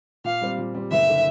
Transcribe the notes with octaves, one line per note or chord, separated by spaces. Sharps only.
A#2 F5
G3 C4
A#2
G3 C4
F#1 E5
D3